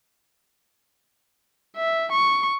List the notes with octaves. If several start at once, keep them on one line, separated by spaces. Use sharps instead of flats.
E5
C#6